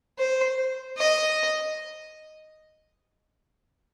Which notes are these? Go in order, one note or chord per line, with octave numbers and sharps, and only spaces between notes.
C5
D#5